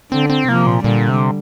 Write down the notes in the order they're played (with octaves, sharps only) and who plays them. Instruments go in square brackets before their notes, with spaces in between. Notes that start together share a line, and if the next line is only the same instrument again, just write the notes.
[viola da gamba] D3 [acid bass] C4
[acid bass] C4
[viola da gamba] C3 F3 [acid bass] A#3
[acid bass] A#2
[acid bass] A#2 [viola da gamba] D3 G3
[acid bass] C3